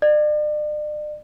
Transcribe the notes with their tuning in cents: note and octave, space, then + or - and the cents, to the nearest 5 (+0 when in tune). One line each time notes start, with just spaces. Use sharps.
D5 +40